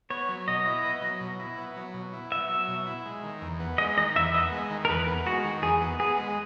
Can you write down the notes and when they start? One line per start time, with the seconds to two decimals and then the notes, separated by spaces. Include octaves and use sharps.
0.10 B3 C#5
0.29 F#3
0.48 B2 D#5
0.66 E4
0.85 B3
1.02 F#3
1.20 B2
1.39 E4
1.58 B3
1.76 F#3
1.94 B2
2.13 E4
2.31 B3 E5
2.49 F#3
2.68 B2
2.87 E4
3.06 G#3
3.23 D#3
3.41 E2
3.60 B3
3.78 G#3 D#5
3.97 D#3 D#5
4.16 E2 E5
4.34 B3 D#5
4.52 G#3
4.70 D#3
4.85 A#4
4.89 E2 B4
5.07 B3
5.26 G#3 F#4
5.44 D#3
5.62 E2 G#4
5.81 B3
6.00 B3 G#4
6.18 G#3